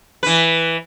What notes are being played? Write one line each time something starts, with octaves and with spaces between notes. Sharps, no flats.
E3 B4